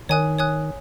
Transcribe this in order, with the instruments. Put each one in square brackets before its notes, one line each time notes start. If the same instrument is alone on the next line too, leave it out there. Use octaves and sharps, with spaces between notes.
[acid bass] D#3 [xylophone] C#5 G#5 D#6 F#6
[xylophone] C#5 G#5 D#6 F#6